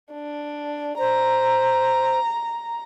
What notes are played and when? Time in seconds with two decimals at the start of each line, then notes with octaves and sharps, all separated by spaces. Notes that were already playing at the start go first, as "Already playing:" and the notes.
0.12 D4
0.99 C5 A#5